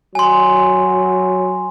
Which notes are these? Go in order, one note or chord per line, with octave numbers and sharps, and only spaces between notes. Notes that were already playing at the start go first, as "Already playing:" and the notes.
F#3 G#5 C6